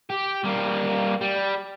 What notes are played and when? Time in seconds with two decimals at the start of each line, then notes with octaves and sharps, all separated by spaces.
0.10 G4
0.44 G3 A#3
1.21 G3